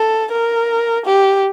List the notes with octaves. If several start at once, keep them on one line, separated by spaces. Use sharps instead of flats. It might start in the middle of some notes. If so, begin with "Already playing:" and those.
Already playing: A4
A#4
G4